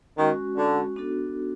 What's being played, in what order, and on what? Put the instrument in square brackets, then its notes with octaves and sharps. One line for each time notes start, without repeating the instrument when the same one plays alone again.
[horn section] D#3 [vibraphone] G#3 C#4 F#4
[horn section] D3
[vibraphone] B3 D4 F#4 A4